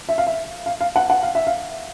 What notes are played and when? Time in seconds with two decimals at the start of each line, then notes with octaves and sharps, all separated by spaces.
0.09 E5
0.18 F5
0.27 E5
0.66 F5
0.81 F5
0.96 F#5
1.10 F#5
1.23 F5
1.35 E5
1.47 F5